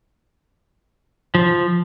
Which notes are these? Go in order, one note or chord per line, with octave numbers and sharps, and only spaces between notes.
F3